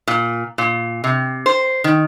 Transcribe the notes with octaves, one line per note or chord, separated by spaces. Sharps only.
A#2
A#2
C3
C5
D#3